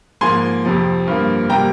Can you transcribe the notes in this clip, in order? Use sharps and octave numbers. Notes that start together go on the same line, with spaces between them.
G#2 F3 A#3 G#5 C6
F2 C3 F3
G2 F3 A#3
C3 G3 A#3 G5 A#5